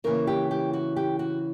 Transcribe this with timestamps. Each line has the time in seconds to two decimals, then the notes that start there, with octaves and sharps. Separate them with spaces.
0.04 C#3 E3 A#3 A#4
0.27 G4
0.51 G4
0.73 F#4
0.96 G4
1.19 F#4